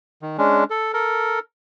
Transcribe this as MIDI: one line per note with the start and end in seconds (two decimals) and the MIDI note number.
0.22 0.37 51
0.38 0.64 56
0.38 0.64 61
0.38 0.64 62
0.70 0.92 69
0.94 1.39 69
0.94 1.39 70